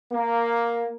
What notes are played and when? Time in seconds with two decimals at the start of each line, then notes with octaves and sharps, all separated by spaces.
0.11 A#3